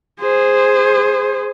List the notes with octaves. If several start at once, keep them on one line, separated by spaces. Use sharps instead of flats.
G#4 C5